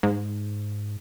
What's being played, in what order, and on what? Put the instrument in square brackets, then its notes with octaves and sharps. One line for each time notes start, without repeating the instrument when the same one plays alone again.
[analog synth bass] G#2